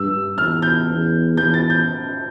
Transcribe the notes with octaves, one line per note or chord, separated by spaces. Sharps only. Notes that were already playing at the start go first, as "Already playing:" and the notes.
Already playing: G2 E6
E2 F6
G6
E2
E2 G6
A6
G6